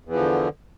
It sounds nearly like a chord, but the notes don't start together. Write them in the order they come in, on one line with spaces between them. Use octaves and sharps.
E2 E3 F3 D3